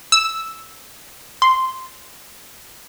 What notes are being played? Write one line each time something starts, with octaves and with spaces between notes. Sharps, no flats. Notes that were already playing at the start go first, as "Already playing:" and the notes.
E6
C6